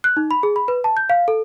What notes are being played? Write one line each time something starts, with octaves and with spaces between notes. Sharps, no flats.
F#6
D#4
B5
G#4
B5
B4
A5
G6
F5
A4